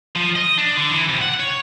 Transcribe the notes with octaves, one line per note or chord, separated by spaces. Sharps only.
F3
D#5
D4
D3
E3
C3
F#5
C#5